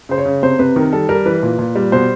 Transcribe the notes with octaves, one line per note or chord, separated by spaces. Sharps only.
C#3 C5
C#5
C#3
C3 C5
C3 B4
D#3 A#4
G3 A4
G3 A#4
E3 B4
A#2
A#2
G3
B2 C5